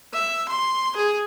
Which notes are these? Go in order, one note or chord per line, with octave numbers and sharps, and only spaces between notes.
E5
C6
G#4